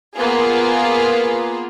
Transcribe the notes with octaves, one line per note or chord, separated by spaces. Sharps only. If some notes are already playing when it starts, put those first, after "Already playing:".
A#3 B3 F4 G#4